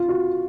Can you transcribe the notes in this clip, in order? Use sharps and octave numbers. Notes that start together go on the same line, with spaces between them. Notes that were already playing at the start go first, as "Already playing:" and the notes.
Already playing: F4
F#4